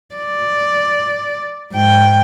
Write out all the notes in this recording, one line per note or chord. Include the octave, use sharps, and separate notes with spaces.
D5
G#2 G5